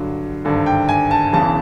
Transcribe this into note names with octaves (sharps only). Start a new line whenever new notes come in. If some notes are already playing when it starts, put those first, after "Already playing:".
Already playing: G2 D3 F#3
G#1 G2 D3
G5
G#5
A5
E1 E2 C#3 E3 A5